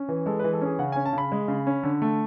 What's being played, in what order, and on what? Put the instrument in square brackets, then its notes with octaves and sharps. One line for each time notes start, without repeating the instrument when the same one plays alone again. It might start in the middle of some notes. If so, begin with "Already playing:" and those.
Already playing: [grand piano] C#4
E3
G#3 A4
B4
E3
A4
C#4 G#4
C#3 F#5
C#4 G#5
A5
C#3 B5
G#3
C#3
C#4
D3
A3